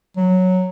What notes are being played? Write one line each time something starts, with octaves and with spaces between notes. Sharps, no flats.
F#3